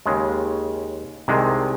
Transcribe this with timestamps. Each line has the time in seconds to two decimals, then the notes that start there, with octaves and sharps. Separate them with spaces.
0.06 D#2 C#3 G#3
1.28 C2 C3 D#3 G#3